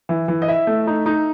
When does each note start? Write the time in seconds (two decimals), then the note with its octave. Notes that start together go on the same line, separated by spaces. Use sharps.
0.09 E3
0.28 E3
0.42 D#5
0.48 E4 E5
0.67 A3
0.87 D#4
1.06 D#4